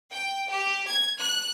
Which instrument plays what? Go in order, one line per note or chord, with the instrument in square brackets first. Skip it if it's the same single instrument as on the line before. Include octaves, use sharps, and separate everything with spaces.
[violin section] G5
G4
G#6
F#6